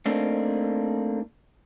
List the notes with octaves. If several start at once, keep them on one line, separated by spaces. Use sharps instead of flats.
A3 A#3 C4 D4 D#4